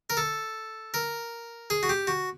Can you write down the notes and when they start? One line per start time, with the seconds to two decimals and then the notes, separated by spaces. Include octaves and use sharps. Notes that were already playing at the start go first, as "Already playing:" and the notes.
0.10 A#4
0.17 A4
0.94 A#4
1.70 G#4
1.83 F#4
1.89 G4
2.07 F#4